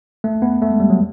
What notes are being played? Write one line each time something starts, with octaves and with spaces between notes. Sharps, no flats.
A3
B3
A3
G#3
G3
F#3